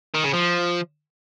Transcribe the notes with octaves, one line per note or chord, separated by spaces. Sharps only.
D#3
C#3
F3